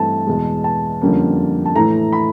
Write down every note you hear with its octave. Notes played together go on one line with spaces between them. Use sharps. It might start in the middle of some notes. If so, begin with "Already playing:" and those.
Already playing: G2 E3 A3 C4 A5
E2 B2 G#3
A5
F2 D3 G3 A#3 C#4
A5
A2 E3 A3 A#5
B5